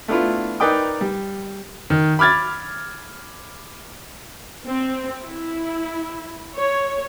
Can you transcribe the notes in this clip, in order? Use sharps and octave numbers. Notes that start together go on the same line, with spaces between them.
A3 B3 D4 E4 F4
D#4 A#4 B4 D5 G5 D#6
G3
D#3
B5 D6 F6 G#6 A6
C4
E4
C#5